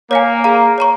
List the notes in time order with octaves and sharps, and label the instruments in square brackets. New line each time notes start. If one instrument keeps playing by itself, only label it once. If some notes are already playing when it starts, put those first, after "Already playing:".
[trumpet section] A#3 [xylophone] C#5 F5 G#5
[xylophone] G#4 F5 A#5
C#5 A#5 C#6